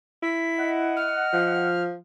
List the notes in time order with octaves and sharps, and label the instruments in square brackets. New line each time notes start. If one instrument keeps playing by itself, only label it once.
[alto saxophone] E4 [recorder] B6
[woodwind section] D#5 F#5
[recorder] F6
[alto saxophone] F3